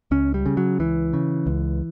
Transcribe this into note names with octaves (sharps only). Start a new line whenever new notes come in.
C#2 C#4
G3
C#3
F#3
C#2 E3
C#3
C#2